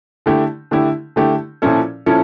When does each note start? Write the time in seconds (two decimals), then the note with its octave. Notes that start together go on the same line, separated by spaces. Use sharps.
0.26 D3 A3 E4 G4
0.71 D3 A3 E4 G4
1.16 D3 A3 E4 G4
1.62 A#2 F3 C#4 E4 A4
2.06 A#2 F3 C#4 E4 A4